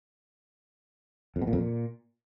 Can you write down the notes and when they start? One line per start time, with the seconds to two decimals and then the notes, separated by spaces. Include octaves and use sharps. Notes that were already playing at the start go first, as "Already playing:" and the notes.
1.36 F2
1.42 B2
1.47 A#2
1.53 F2
1.59 A#2